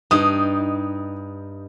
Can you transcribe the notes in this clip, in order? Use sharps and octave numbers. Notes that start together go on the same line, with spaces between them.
G2 D#4 D#6